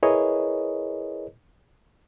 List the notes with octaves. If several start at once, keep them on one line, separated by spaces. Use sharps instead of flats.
E4 G#4 A#4 B4 C#5 D#5